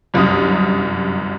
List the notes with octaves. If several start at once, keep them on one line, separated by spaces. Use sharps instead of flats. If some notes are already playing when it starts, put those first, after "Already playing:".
G1 C2 F#2 D#6